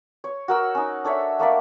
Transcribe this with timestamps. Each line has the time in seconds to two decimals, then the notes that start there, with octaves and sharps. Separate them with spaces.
0.24 C#5
0.48 F#4 A#4 E6
0.75 C#4 D#4
1.05 D4 A4 C#5 E5
1.39 A3 A#3 D5 E5